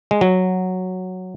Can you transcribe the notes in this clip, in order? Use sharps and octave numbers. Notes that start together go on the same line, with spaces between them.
G#3
F#3